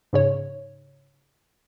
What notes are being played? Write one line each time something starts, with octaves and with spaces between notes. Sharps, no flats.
G#2 C#3 C#5